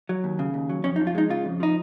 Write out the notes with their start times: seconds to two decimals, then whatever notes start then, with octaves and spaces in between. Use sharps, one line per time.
0.09 F#3
0.24 D#2
0.39 C#3
0.54 D#2
0.69 F#3
0.84 F2 C#4
0.96 D#4
1.00 F3
1.07 F4
1.15 G#3 D#4
1.29 C#3 F4
1.45 F2
1.60 F3 D#4